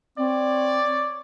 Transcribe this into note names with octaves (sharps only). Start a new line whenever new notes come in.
C4 C#5 D5